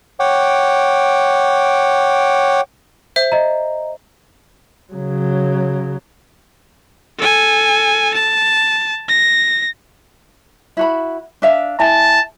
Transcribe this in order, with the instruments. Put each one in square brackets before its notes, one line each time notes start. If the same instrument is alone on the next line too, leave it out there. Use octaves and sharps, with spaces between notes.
[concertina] C#5 F#5 G5 D6
[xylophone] C5 E5
[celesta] D#5 A#5
[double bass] C#3 F#3
[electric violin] A4 G#5
A5
A#6
[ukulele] E4 F#4 B5
D4 E5 F5
[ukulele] E4 G#5 [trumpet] A5